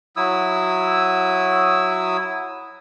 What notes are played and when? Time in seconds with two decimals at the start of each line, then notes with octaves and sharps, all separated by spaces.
0.17 F#3 E4 D#6 E6